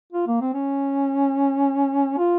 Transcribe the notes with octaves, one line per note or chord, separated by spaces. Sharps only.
F4
A#3
C4
C#4
F4